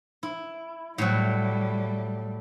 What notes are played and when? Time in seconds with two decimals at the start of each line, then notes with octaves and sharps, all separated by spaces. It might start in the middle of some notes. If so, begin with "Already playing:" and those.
0.23 E4
0.98 A2 F#3 G3